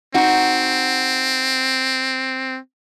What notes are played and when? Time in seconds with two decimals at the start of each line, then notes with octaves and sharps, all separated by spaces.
0.14 C4 D#4 F#4